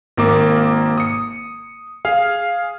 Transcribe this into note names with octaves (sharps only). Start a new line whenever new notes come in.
G#1 A#3 D6
D#6 C#7
G#4 F5